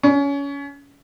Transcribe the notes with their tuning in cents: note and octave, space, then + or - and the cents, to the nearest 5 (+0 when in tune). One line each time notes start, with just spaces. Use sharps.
C#4 +25